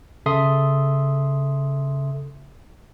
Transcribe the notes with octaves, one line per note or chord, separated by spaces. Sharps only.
C#3 A4 E5 C6 D#6